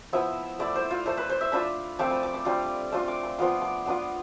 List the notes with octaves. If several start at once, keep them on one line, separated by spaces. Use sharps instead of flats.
F3 B3 E4 E5
A3 E4 D5
C5
F4
A3 E4 C5
B4
C5
E5
A3 D4 F4 B5
F3 A3 C4 F4 D6
B5
D6
D6
G3 D4 F4
A3 D4 F4 C6
D6
C6
F3 B3 F4 C6
D6
B3 D4 F4